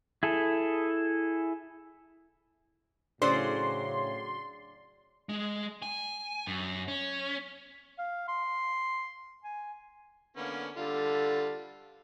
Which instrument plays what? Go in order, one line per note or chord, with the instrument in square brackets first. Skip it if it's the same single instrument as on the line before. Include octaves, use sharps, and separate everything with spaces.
[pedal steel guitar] E4 G#4 A4
[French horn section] A2 C#3 [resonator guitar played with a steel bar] F#3 C#4 C5 [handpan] D5 [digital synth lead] C6
[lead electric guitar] G#3
G#5
F#2
C#4
[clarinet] F5
C6
G#5
[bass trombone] D3 [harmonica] A#3 B3 C#4
[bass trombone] D3 [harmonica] G3 F4 [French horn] A4